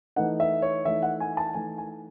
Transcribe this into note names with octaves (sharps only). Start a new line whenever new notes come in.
E3 A3 D#4 F#5
E5
C#5
E3 A3 D#4 E5
F#5
G#5
A5
E3 A3 D#4 G#5
G#5